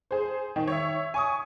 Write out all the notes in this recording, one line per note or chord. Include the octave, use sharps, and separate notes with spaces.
G#4 C5
D#3
C#5 E5
G#5 C#6 D#6